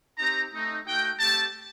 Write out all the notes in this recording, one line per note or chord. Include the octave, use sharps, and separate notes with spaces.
C4 D#4 G4 A#5
A3 C4 D#4
A3 D#4 F#4 G5
A3 C4 G4 A5